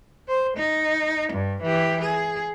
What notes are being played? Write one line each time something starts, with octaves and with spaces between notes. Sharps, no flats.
C5
D#4
G2
E3 G4
G#4